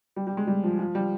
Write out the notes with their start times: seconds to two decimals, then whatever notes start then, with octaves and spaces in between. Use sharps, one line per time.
0.16 G3
0.27 G3
0.37 G#3
0.47 G3
0.64 F3
0.79 F3
0.95 G3